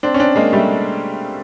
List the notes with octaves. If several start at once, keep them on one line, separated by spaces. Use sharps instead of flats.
C4 D4
C#4
C4 D4
G#3 A#3
G3 A3